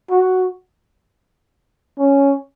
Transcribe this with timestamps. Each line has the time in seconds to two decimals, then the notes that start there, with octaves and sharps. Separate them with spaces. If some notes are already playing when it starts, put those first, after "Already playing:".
0.10 F#4
1.98 C#4